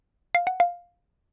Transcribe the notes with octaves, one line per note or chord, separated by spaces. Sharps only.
F5
F#5
F5